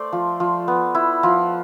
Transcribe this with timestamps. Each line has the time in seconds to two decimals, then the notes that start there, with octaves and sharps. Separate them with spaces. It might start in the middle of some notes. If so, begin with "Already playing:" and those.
Already playing: A3 C5 D5
0.13 F3
0.40 F3
0.68 B3
0.95 E4
1.23 F3